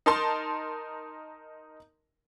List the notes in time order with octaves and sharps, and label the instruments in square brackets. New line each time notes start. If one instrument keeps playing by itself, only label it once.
[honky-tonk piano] D#4 A#4 A5 C6